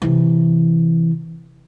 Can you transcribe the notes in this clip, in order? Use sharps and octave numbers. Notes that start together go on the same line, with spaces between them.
C3 E3